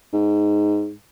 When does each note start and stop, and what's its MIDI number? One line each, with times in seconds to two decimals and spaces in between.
0.13 0.92 44